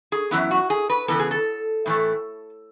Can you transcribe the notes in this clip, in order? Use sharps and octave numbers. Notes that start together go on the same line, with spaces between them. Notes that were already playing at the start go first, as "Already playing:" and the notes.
G#4
F#2 E3 B3 E4
F#4
G#4
B4
C#3 E3 B3 A4
G#4
A4
A2 E3 A3